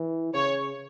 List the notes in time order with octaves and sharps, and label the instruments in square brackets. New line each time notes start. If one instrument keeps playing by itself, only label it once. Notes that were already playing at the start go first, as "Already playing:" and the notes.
Already playing: [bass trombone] E3
[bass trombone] C#3 [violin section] C#5